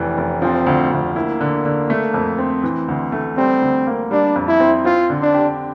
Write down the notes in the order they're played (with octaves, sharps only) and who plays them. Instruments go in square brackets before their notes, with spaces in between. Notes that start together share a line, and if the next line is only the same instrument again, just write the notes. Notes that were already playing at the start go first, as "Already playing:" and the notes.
Already playing: [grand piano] F1 E3
F1
[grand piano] F3 [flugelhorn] C4
[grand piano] D2
D2
[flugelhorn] A#3 [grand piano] E4
[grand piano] D3
D3
A3
F2
C4
E3
D2
A3
[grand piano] G3 [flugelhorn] C4
[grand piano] D2
A#3
[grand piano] G3 [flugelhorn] D4
[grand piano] F2
[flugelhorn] E4
[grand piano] C4
[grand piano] C4 [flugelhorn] F4
[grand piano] D3
[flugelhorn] D4
[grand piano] G4